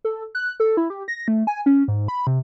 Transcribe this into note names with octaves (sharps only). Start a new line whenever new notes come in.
A4
F#6
A4
E4
G4
A#6
A3
G#5
C#4
G#2
B5
C3